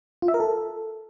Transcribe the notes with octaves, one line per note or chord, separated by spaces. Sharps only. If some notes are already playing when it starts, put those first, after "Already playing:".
F4
E5
A#4
A4